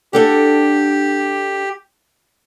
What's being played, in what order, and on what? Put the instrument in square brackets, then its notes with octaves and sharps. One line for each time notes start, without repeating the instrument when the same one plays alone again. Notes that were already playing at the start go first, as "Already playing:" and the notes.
[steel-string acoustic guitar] D4 A4 F#5 [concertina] G4